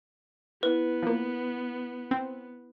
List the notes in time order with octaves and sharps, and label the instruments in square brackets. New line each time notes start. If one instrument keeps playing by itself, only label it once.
[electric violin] B3 [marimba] E4 [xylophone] B4
[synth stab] F3 A#3
C4